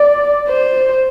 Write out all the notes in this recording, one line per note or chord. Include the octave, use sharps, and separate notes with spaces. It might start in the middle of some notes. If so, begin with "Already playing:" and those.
Already playing: D5
C5